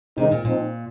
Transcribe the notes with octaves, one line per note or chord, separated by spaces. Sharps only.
C3 D#3 G#3 C4 D#4
A#2
A#2 F3 C4 D#4